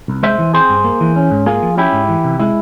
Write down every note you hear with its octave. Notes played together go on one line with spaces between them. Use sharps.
C2
G#3 C5 E5
E3
C4 G#4 C5
G2
A#3
E3
C#4
G#2
A#3 F4 G#4
F3
C#4 E4 G4
G#2
E3
C3
G#3 E4